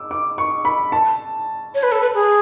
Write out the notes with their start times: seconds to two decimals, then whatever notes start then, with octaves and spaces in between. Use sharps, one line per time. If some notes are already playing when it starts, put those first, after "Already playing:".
Already playing: D6 E6
0.11 D6
0.38 C#6
0.65 B5
0.92 A5
1.75 C#5
1.83 B4
1.92 A4
2.01 B4
2.15 G#4